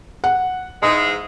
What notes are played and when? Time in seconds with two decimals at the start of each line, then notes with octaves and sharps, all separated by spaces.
0.24 F#5
0.83 G#2 E3 G#3 D#6